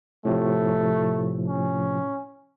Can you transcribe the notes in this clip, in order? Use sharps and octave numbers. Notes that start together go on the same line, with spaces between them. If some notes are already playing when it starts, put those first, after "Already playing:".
A2 C3 F3 A3
C#4